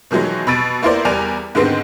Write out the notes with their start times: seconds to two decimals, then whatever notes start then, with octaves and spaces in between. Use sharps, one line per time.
0.11 B2 D#3 E3 F#3 G#3
0.47 B2 B5 E6 A6 D7 D#7
0.82 A#3 B3 E4 A#4 C5 D5
1.05 E2 G3 A#4 D5 G#5 F7
1.55 G#2 D3 D#3 G#3 B3 C4